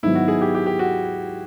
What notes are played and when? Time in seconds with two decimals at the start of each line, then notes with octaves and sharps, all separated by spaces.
0.03 G#2 D#3 F#3 B3 E4
0.15 F#4
0.28 G#4
0.41 G4
0.55 G4
0.66 G4
0.79 F#4